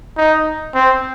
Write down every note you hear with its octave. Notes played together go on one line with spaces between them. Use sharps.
D#4
C4